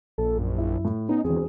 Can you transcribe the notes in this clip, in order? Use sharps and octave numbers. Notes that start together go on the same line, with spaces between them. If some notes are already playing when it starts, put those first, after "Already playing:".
A#1 A4
F#2
E4
A2
B3 C#4 D#4
E1 E2 C4 G#4